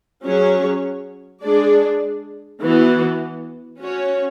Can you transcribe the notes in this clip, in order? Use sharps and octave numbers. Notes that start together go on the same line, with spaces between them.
F#3 C#4 G#4 C#5
G#3 D4 G#4 D5
E3 B3 F#4
C#4 F#4 C#5